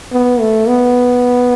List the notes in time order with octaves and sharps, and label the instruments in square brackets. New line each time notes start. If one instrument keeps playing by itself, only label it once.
[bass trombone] B3
A3
B3